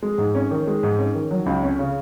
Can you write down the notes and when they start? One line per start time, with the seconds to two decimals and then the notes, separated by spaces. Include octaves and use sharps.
0.03 G#3
0.18 G#2
0.35 C#4
0.51 D#3
0.67 G#3
0.83 G#2
0.99 C#4
1.15 D#3
1.31 F#3
1.46 C#2
1.63 C#4
1.79 C#3